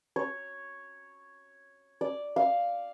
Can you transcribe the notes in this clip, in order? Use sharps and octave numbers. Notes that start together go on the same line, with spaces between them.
C#5
D5
F5